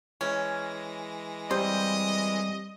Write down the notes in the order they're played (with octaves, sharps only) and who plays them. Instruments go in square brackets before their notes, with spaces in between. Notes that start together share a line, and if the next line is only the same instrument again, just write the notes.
[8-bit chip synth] E3 G#3 A#6 [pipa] C#4
[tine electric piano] G3 C4 [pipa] C5 [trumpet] D#5